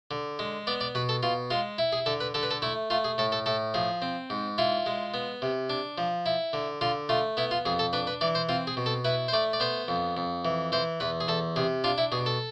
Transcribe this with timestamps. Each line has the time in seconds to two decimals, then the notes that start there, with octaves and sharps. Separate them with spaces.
0.11 D3
0.39 G#3
0.67 B3 D5
0.81 D5
0.95 B2 B4
1.09 A4
1.23 B2 F4
1.50 G#3 F4
1.78 E4
1.92 G#4
2.06 D3 A4
2.20 B4
2.34 D3 A4
2.43 B4
2.51 A4
2.62 A3 E4
2.90 A3 F4
3.04 G#4
3.18 A2 A4
3.32 A4
3.46 A2 A4
3.74 F3 G#4
4.02 C4
4.30 G#2
4.58 E4 F4
4.86 G#3
5.14 B3
5.42 C3
5.70 D4
5.98 F3
6.26 E4
6.53 D3
6.81 D3 F4
7.09 A3 F4
7.37 B3 E4
7.51 F4
7.65 F2 G#4
7.79 A4
7.93 D4 B4
8.07 B4
8.21 E3 D5
8.35 C5
8.49 C4 F4
8.67 G#4
8.77 B2
8.86 A4
9.05 E4 B4
9.28 C5
9.33 A3 D5
9.53 D5
9.60 B3 C5
9.88 F2
10.17 F2
10.45 E3
10.72 E3 C5
11.00 E2 B4
11.21 G#4
11.28 E2 A4
11.56 C3 G#4
11.84 D4 F4
11.98 E4
12.12 B2 G#4
12.26 A4